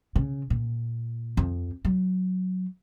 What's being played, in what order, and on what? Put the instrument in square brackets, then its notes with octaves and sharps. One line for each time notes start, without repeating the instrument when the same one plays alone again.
[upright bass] C#3
A#2
F2
F#3